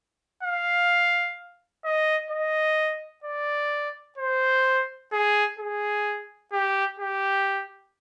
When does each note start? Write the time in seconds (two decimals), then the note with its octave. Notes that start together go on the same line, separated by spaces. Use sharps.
0.43 F5
1.84 D#5
2.31 D#5
3.24 D5
4.18 C5
5.12 G#4
5.59 G#4
6.52 G4
6.99 G4